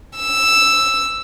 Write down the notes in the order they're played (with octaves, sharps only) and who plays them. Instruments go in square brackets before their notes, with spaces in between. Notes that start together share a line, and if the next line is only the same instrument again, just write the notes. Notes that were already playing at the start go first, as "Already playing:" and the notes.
[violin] E6